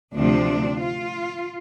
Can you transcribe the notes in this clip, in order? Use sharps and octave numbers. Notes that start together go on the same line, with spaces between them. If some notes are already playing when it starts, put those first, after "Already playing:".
D2 C3 F3 D4
F4